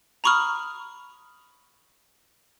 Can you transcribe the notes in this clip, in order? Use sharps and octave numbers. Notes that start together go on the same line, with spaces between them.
A#5 B5 C#6 D#6 F6